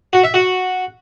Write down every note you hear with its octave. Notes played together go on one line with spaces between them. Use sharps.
F#4
E5
F#4